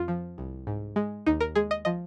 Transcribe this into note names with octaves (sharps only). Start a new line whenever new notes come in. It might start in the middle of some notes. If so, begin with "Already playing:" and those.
Already playing: F2 F4
F3
C2
G#2
G#3
D#2 D#4
A#4
G#3 G#4
D#5
F3 D#5